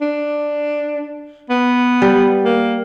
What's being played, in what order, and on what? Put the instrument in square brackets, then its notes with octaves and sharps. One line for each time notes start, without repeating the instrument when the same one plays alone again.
[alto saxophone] D4
B3
[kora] G3
[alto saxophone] A#3